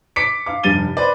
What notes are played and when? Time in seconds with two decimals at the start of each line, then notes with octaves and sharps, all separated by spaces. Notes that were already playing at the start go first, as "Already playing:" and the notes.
0.16 D6 B6 C#7 D7
0.46 F5 D6
0.63 F1 G2 G3 A6 D#7 G7
0.97 B4 C5 D5